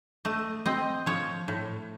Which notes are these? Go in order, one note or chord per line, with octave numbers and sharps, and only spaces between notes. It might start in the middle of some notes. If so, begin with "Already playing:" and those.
A3 D#5
C4 D#5
F3 C#5
A2